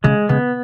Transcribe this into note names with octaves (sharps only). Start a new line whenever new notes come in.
C#3 G#3
C#3 B3